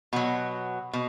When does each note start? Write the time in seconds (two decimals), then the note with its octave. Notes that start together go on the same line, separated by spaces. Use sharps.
0.13 B2 F#3 F#4
0.93 B2